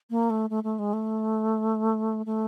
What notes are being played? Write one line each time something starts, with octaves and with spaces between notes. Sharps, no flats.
A#3
A3
A3
A3
G#3
A3
A3